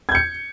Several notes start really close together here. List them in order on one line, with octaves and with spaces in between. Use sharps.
G#6 G6 C#7